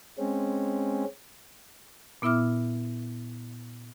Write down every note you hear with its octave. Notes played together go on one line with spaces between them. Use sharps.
G#3 C4 C#4
A#2 B3 E4 E5 D6 F6